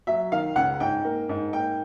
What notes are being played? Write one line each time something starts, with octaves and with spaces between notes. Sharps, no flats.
F#3 E5
D#3 F5
C#2 F#5
G#2 G5
A#3
G#2
A#3 G5